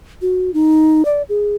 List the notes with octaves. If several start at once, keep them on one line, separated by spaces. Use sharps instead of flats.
F#4
D#4
D5
G#4